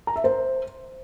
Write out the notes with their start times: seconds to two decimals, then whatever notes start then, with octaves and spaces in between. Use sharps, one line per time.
0.07 A#5
0.16 E5
0.24 C5